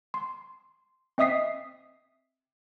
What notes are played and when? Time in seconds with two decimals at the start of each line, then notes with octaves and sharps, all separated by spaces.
0.14 C6
1.18 C4 D#5 E5 D#6 B6 C7